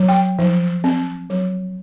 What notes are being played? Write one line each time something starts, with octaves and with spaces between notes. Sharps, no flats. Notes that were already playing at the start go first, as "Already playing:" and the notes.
Already playing: F#3
G5
F3
C4
F#3